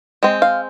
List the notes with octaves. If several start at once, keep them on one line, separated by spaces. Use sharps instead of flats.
G#3 C4
F5